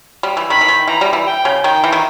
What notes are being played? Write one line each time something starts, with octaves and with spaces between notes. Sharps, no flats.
G3
E3
D#3 B5
E3
D#3
E3 A#5
G3
E3
G5
C#3
D#3 G5
E3
D#3